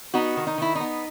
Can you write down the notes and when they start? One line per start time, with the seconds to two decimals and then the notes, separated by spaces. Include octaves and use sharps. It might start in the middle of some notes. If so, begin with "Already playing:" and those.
0.14 B3 D#4 F#4
0.37 D#3
0.47 D#4
0.58 D#3 E4
0.75 D#4
0.80 B3